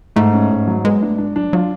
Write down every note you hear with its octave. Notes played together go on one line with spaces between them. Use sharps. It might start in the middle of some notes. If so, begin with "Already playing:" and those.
G#2 A3
C#4
G#2
F#3
G#3 B3
A3 D4
G#3 D4
F#3 D4
F#3 F4